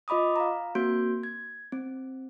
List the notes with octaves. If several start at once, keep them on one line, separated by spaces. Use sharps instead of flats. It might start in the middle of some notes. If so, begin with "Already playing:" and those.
F4 D#5 B5 D6 D#6
F5 A#5
A#3 C4 F#4 C6 G6 D7
G#6
C4